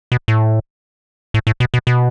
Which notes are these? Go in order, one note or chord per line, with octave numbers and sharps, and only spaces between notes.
B2
A2
A2
A2
B2
B2
B2